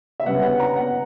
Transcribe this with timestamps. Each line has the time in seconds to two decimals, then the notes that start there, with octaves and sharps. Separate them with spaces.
0.20 E5
0.26 C#3 G3 B3 F#5
0.42 F#5
0.60 A#5
0.76 F#5